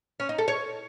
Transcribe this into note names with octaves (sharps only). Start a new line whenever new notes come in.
C#4
D#4
A4
C#5